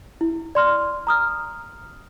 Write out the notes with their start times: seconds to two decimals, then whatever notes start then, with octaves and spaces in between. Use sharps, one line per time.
0.21 E4
0.55 D5 C6 F6
1.07 A#5 D#6 F6